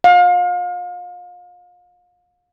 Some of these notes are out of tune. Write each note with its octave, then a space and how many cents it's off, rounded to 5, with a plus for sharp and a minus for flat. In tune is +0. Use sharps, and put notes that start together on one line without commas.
F5 +35